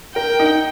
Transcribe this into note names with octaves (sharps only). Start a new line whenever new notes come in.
A#4 G5
D#4